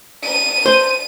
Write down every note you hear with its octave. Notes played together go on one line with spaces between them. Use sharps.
D#7
C5